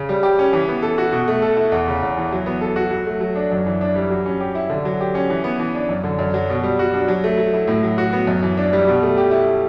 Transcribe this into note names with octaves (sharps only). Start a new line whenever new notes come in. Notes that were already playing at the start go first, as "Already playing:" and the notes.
Already playing: C#3
G3
G4
C#4
E3
B3
A4
F#4
B2
A3
A4
E4
E2
C#3
E2
E3
F#3
B3
A4
F#4
F#3
A3
F#3
D4
F#2
E3
D4
G3
F#3
C#4
G4
E4
D3
F#3
G4
C#4
E3
B3
E3
D4
F#2
D3
F#2
F#3
B2
G3
F#4
D4
F#3
A3
F#3
E4
A2
F#3
F#4
B3
F#2
E3
D4
G3
B2
A3
G4
E4